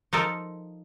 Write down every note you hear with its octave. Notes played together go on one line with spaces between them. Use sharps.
F3 D#4 A4 A#4